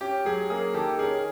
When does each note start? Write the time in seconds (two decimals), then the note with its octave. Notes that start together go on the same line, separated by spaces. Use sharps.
0.01 C#4 G4
0.25 F#3 G#4
0.50 A#3 G#4
0.74 D#3 G4 A4
0.99 C#4 G#4 A#4